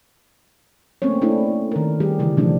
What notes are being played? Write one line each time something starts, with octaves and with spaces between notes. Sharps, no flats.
A3 A#3 C4 C#4 C#5
A3 D4 E4 A4
D#3 A#4
G3 G4 G#4
C#3 E3 G#3
B2 F3 G#3 A3 C#4 D4